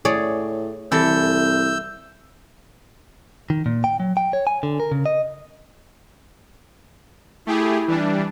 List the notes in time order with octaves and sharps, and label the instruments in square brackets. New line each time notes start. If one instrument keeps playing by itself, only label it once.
[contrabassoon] A2 [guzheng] G#4 C#5 D5
[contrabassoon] C2 [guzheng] E3 A4 [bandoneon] E6 G6
[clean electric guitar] D#3
A#2
G5
F#3
G5
C#5
G#5
D3
A#4
C#3
D#5
[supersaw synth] A3 G4 G#4 [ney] E4
[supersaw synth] E3 G3 D4